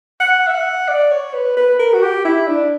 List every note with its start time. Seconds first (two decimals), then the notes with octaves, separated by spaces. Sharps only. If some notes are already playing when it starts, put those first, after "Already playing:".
0.20 F#5
0.47 E5
0.55 F#5
0.88 D5
1.11 C#5
1.34 B4
1.57 B4
1.79 A#4
1.93 F#4
2.02 G4
2.25 E4
2.48 D4